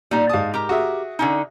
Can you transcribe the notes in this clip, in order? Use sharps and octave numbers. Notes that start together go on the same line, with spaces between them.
A#2 G3 D#4
G#2 F5 A5 D#6
G4 A#4 A#5
F#4 G#4 E5
D3 C#4 D#4